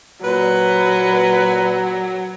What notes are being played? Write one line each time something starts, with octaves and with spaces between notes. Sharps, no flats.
A#2 F#3 B4